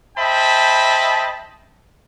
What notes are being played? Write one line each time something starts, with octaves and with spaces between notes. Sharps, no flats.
C5 D#5 E5 G5 A5 B5